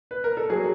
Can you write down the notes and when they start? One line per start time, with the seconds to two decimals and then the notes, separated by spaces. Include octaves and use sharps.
0.11 B4
0.24 A#4
0.37 A4
0.49 F#3 G#4